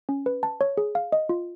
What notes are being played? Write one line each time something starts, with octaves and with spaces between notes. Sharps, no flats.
C#4
B4
A5
C#5
G#4
F5
D#5
F4